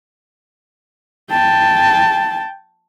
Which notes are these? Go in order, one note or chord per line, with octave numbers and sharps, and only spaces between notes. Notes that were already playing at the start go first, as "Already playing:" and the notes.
G5 A5